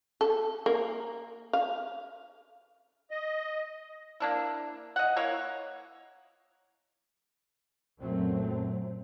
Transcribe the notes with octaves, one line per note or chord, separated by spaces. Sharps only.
A4
A#3
F5
D#5
A#3 D4 E4
D#5 F#5
A#3 E4 C#5
F#2 A#2 F#3 A3 C4